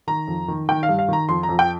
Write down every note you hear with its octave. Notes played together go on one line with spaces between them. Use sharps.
D#3 A#5
F2
D#3
D#3 G5
F5
G2
F5
D#3 A#5
F2 C6
A#5
F2
G5